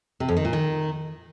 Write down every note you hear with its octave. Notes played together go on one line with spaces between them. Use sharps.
C3
F2
D#3
A#2
D#3